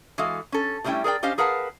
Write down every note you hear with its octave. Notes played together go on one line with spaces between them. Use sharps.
E3 G#3 F#4 A4 F5
C#4 A4
B2 G3 A3 C#4 E4 G5
G#4 A#4 D5 G5
C#4 G4 C5 D#5 F5
G#4 A#4 B4 F5 F#5 A5